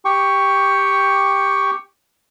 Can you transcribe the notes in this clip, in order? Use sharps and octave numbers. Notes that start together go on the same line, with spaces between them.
G4 G5 C#6